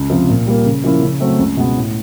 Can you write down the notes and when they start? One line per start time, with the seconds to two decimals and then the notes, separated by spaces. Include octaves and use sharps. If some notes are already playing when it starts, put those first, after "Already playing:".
Already playing: C#2
0.10 C3 F3
0.29 A#2
0.47 G3 A#3
0.66 C#3
0.84 F3 A#3 C#4 E4
1.03 C#3
1.20 F#3 A3 C4
1.39 C#2
1.57 B2 G#3 B3
1.76 A2